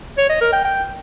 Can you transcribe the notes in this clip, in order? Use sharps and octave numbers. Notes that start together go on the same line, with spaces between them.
C#5
D#5
A#4
G5
G5